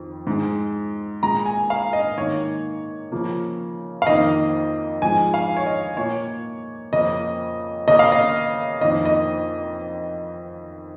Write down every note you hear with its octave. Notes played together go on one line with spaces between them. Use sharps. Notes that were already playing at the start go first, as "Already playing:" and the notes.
Already playing: F2 D#3
G#2 G#3
A#2 G#3 A#5
G#5
F5
D#5
G#2 D#3 A#3 C#5
C#3 F3 A#3
F5
F2 D#3 A#3 D#5
G#2 F3 G#3 G#5
F5
C#5
D#5
A#2 A#3 C#5
F2 C#3 A#3 D#5
C#3 A#3 D#5
F5
D#5
F2 D#3 A#3 D#5
D#5